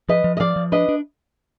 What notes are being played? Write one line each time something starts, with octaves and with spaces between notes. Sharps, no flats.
F3 B4 D#5
F3
D#5
F3 D5 F5
F3
D4 B4 D#5
D4